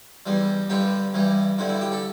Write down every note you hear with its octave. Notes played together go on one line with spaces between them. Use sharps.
E2 E3 G3
G2 D3 G3 G4
G2 E3 G3
G2 D3 G3 E4
E4
G4
A4